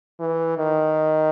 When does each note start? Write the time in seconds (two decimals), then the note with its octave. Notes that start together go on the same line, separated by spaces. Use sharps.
0.20 E3
0.58 D#3